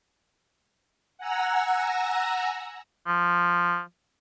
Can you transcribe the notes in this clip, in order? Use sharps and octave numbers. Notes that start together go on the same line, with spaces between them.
F#5 G#5 A#5 E6 A#6
F3